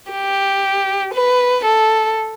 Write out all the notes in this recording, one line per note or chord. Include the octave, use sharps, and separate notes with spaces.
G4
B4
A4